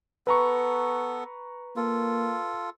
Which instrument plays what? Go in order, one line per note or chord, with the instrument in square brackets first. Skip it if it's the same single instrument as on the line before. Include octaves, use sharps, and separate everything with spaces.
[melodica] B3 A4 [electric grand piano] B4 A#5 C#6
[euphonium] A#3 [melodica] F4 A4